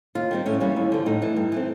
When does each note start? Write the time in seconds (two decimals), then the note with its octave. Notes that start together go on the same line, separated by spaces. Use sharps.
0.15 D#2 F4
0.31 D#3 G3 C4
0.46 A2 C#4
0.60 E3 G3 A#3
0.76 D#2
0.92 D3 F3
1.06 A2 D#4
1.22 E3 A3
1.36 G2
1.52 E3 A3 C4